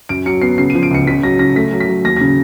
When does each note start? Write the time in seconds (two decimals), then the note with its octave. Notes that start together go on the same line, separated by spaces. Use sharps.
0.09 F#2 D7
0.26 F#3 C#7
0.41 B3 C7
0.58 C#3 C7
0.70 D#7
0.75 F3
0.83 D7
0.91 C#2 C#7
1.07 C#3 B6
1.23 F#3 A#6
1.39 C#3 A#6
1.56 A3 B6
1.72 F#3
1.80 B6
1.88 F#3
2.04 D#2 A#6
2.17 C#3 A#6